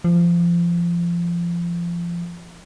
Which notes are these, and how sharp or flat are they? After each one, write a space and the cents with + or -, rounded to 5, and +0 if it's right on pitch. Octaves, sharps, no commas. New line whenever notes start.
F3 -25